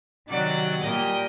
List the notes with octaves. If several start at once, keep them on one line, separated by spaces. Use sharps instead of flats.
C3 D#3 F#3 D5 F#5
A#2 G3 A#3 D#5 G5